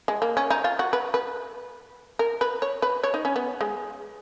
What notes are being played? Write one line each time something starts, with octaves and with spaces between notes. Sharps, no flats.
G#3
A#3
C#4
D#4
F4
F#4
B4
B4
A#4
B4
C#5
B4
C#5
D#4
C#4
B3
G#3